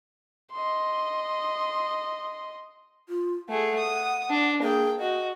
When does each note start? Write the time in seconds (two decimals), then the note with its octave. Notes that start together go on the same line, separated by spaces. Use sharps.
0.52 D#5 C6
3.09 F4
3.49 A3 G#4 F#5
3.79 D#6
4.30 D4
4.62 A#3 G#4 G5
4.99 F#4 D#5